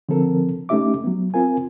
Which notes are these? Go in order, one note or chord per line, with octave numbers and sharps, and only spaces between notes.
D3 F3 C4 A4 A#4
A3 C#4 D#4 G4 E5 D6
F#3 B3
C4 F4 A#4 G#5